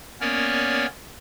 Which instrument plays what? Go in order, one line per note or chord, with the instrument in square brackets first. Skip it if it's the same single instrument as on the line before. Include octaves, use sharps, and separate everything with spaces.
[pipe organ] A#3 B3 C#4 A#4 C#5 D5